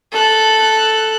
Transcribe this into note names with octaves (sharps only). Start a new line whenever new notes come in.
A4 F#6